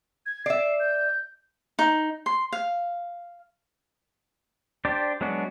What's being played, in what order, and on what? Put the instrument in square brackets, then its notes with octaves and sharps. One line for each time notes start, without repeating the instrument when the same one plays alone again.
[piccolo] G#6
[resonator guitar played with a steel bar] D5 E5 [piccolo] C7
[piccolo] G6
[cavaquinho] D#4
C6
F5
[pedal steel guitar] D4 G4 C5 D5
F#3 G#3 B3 D4 F#4